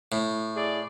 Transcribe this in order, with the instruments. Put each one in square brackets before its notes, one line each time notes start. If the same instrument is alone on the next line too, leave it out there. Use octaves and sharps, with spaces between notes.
[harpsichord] A2
[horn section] E4 G#4 D5